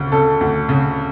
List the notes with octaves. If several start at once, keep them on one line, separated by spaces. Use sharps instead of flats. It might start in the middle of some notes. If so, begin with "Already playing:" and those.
Already playing: D2 C#3
C#3 A4
D2
C#3